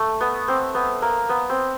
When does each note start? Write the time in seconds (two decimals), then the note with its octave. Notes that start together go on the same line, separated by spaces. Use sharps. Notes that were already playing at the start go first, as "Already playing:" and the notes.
Already playing: A3
0.21 B3
0.48 C4
0.75 B3
1.02 A#3
1.29 B3
1.50 C4